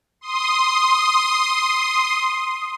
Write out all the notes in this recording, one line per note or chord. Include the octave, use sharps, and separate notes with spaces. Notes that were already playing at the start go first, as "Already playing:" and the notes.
C6 D#6